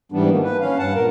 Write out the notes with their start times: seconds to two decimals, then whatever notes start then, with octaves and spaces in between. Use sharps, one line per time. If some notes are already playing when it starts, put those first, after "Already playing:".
0.12 G#2 E3 G3 B3 D4
0.30 D#3 F3 A#3
0.43 B4
0.60 C#4 F5
0.79 G2 F#5 A5
0.95 A#2 A#4